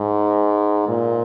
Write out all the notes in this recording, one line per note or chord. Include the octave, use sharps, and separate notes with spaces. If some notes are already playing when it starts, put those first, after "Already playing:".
Already playing: G#2
A#2